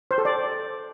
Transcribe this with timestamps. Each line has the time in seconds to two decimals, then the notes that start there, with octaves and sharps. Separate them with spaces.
0.11 C5
0.18 A4
0.25 D5